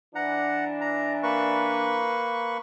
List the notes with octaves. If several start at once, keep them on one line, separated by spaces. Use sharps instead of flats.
E3 D4 F#5 A#5
A#5
A#3 B4 C#6